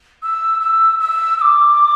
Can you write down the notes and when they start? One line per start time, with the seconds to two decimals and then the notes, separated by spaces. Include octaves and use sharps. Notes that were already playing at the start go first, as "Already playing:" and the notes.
0.23 E6
0.60 E6
1.00 E6
1.38 E6
1.41 D6